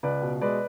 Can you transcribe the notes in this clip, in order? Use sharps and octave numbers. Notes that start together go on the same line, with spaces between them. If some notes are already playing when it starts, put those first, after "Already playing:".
C#2 B4 D5
B2
G#3 B4 D5